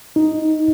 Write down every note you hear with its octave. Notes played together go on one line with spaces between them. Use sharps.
D#4